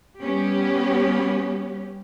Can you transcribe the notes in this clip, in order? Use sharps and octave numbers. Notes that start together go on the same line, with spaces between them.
G3 B3 C#4 G4